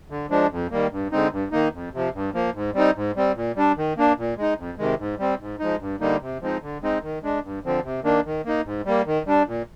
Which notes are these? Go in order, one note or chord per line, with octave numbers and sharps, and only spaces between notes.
D3
F3 G#3 D4
F2
D#3 G3 A#3
G2
D3 G#3 C4 D#4
G2
D#3 A#3 D#4
F2
C3 F3
G2
F3 A#3
G#2
G3 C4 D#4
G#2
G3 C4
A#2
G3 D4
D#3
A#3 D4
A#2
G#3 D#4
F2
C3 D#3 G#3
G#2
G3 C4
G#2
F3 G#3 D#4
G2
D3 G3 A#3 D#4
C3
F3 G#3 C4 D#4
D3
G#3 C4 D#4
D#3
G#3 D4
G2
D3 F3 C4
C3
D#3 A#3 D4
D#3
A#3 D#4
G#2
G3 A#3
D#3
G3 D4
A#2